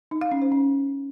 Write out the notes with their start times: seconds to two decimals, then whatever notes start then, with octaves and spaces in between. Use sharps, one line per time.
0.11 D#4
0.21 F5
0.32 C#4
0.42 C5
0.52 C#4